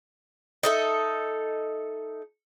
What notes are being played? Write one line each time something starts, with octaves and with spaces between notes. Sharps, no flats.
D#4 A4 E5